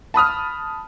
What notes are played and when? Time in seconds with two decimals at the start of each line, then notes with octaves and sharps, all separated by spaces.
0.14 A5 B5 D#6 F6